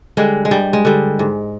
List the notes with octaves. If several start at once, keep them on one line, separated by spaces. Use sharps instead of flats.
D3 G3 G#3
G#3
G2 G3
G#3
D3 G3
G#2